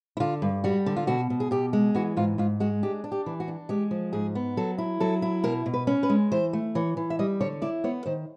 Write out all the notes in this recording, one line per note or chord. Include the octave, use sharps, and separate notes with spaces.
E4
D3 F4
G2
G3 F#4
D3
F4
B2 F#4
B2
G#4
B2 G4
G#3
E3 F#4
G#2 F4
G#2 F4
G#3 F#4
D4 G4
D4
G4
E3
F#4
D4
G#3 G4
F3
G#2 G#4
B3
F#3 A4
E4
F#3 A4
E4
B2 A#4
B2
B4
C#4
B4
G#3
E3 C5
A3
E3 C#5
E3
E5
G3 D#5
D3 C#5
E4 D5
B3 C#5
D#3 C5